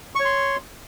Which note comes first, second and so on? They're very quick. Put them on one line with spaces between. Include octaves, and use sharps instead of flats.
C#6 C#5 C6